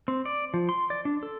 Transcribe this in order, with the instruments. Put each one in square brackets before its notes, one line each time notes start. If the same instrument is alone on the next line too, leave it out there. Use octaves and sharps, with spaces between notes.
[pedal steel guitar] C4
D5
F3
C6
D5
D4
A4